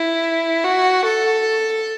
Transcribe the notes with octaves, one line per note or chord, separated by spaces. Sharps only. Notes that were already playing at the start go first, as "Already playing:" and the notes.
Already playing: E4
F#4
A4